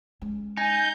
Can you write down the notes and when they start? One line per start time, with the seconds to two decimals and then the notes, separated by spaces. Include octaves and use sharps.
0.22 G#3 C#4
0.57 D#4 G#5 G6